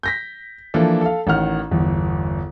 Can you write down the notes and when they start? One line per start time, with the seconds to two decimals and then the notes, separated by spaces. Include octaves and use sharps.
0.03 G6 A#6 B6
0.74 E3 F3 A#3 D4 A4
1.01 A4 F5
1.27 A1 D#3 F#5 F6
1.71 G1 E2